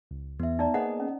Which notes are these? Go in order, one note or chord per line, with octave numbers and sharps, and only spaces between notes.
C#2
E2 B3 E5
D#4 D5 A#5
A#3 B3 G#4 C5 D#5 F#5
C#4